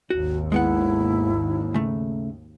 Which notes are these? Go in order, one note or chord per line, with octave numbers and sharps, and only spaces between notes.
G#1 D#2 F#4
G#3 B3 E4 F#5
C#3 A3